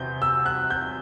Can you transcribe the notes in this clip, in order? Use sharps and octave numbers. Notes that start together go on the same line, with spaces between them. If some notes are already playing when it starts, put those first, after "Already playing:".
Already playing: E2 C3 C4 G6
E6
F#6
G6